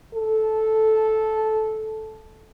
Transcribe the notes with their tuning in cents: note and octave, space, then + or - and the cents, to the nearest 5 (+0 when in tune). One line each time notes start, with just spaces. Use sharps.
A4 -10